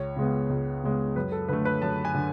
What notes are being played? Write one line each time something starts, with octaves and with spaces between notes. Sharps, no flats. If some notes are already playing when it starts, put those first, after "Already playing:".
Already playing: C#2 C#5
C#3 G#3 B3
C#2
C#3 G#3 B3
F#2 B4
A4
D3 A3 B4
B4
F#2 A5
G#5
D3